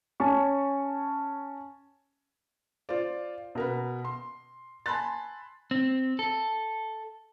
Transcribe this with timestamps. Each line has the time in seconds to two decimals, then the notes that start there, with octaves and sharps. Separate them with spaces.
0.20 C#4 G#5 A5 C#6
2.89 F4 C5 D5
3.55 B2 A#4 B4
4.05 C6
4.86 G#5 A5 B5 C6 F#6 A6
5.71 C4
6.19 A4